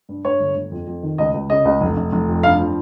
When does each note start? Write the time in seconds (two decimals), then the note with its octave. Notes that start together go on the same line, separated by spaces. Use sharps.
0.09 G2
0.24 G2 C#5
0.40 G1
0.56 G1
0.71 F2
0.87 F2
1.03 D#3
1.18 C#2 D#5
1.34 C#2
1.50 C#3 D#5
1.65 C#2
1.81 F1
1.97 F1
2.12 F1
2.28 F2
2.43 G2 F5
2.59 F3